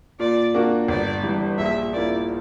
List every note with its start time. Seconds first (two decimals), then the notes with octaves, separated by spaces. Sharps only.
0.20 A#2 D5
0.54 A#3 D4 F#4
0.88 G1 D5
1.23 G2 E3
1.58 A#1 E5
1.93 A#2 A#3 E4 D5